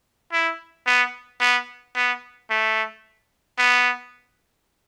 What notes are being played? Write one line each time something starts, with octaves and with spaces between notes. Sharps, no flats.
E4
B3
B3
B3
A3
B3